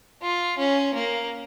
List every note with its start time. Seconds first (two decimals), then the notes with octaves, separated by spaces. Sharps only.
0.22 F4
0.58 C#4
0.94 A#3